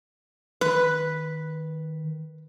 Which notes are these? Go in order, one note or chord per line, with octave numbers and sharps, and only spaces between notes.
D#3 B4